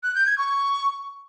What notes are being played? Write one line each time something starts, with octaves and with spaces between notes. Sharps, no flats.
F#6
G6
G#6
C#6